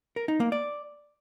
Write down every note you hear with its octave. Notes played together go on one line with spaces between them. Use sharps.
A#4
D#4
A#3
D5